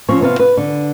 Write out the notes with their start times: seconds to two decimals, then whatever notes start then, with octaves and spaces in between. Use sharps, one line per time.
0.08 F3 C4 C#4 C#5
0.21 C3 B3 C4 F5
0.39 B4
0.57 D3